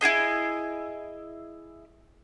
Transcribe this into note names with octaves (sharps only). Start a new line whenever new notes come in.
E4 F#4 G#4 D#5